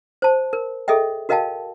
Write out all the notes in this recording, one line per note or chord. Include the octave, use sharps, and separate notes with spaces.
C5 A5
A#4
G#4 A4 D#5 E5 G5
F#4 A#4 D#5 F5 G5 A5